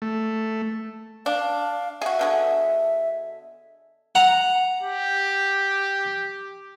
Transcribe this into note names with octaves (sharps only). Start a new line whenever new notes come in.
A3
D4 F5
F#4 G#4 E5
B2 D3 G#4
F#5 A#5
G4